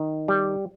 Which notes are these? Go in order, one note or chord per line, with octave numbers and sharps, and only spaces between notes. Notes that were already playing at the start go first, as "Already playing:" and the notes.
Already playing: D#3
G3